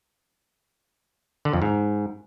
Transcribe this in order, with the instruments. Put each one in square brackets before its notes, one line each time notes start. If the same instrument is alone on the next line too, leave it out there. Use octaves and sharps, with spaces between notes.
[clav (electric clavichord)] D3
F2
G#2